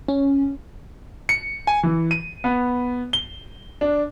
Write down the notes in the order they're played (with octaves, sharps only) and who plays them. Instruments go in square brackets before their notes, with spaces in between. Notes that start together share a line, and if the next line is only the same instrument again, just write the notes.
[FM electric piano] C#4
[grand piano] C#7
G#5
E3
D#7
B3
G7
D4